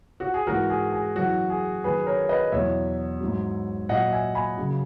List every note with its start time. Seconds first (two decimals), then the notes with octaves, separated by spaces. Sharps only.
0.20 F#4
0.34 G#4
0.47 G#2 E3 F#4 A#4
0.70 G#4
0.93 G#4
1.16 F#2 E3 F#4
1.50 G#4
1.84 F#2 D#3 F#3 G#4 B4
2.06 A#4 C#5
2.29 B4 D#5
2.52 E2 B2 F#3 C#5 E5
3.20 G#2 F#3
3.89 A#2 F#3 D#5 F#5
4.12 E5 G#5
4.35 G#5 B5
4.58 F#2 C#3 F#3